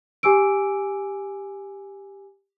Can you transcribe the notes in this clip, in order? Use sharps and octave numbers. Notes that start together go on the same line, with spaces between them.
G4 G#5 D6 E6 D7